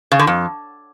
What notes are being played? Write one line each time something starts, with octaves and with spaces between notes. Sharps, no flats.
C#3
D3
F2